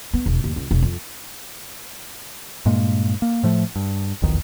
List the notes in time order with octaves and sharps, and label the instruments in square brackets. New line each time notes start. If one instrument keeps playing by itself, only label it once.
[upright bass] B3
E1
D#2
C#2
E1
F2
[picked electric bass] G2 A#2 G#3 A#3
A#3
A2 F3 A3
G2
F1 B1 E2 D#3